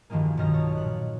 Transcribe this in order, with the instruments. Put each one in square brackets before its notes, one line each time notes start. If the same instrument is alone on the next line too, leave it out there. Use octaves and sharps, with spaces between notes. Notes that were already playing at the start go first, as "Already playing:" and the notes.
[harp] E1 G2 D#3 F3 G#3 A#3
B1 G2 D#3 D#4 F6 A#6
C#5 A5 F6
A#2 F#6